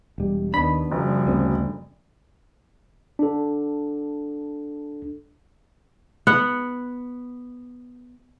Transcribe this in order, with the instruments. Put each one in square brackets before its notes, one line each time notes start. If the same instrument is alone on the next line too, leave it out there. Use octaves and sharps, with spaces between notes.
[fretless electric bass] E1 G3
[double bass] D#2 B3 [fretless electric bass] D4 [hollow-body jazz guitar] B5
[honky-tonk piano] F#1 [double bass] F3 G3
[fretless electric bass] D2 C4 C#4
[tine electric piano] D4 A4
[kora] B3 F#5